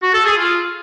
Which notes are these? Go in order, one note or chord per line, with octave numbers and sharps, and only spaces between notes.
F#4
A4
G#4
F4